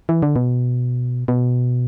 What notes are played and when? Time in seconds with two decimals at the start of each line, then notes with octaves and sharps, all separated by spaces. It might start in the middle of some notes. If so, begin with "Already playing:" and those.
0.09 E3
0.22 D3
0.36 B2
1.28 B2